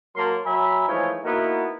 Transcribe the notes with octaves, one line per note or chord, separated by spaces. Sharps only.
F#3 A#3 A#4 A5 C6
F#3 E5 G#5 A#5 B5
E3 F3 G#3 A3 D#4 C#5
A#3 B3 D#4 E4 F#4 A#4